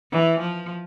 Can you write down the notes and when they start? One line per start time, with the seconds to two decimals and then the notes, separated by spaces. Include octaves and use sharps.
0.11 E3
0.40 F3